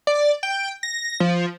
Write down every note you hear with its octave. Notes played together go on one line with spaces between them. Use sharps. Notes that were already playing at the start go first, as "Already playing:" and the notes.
D5
G5
A#6
F3